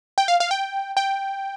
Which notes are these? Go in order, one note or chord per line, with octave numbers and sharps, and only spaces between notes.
G5
F5
F5
G5
G5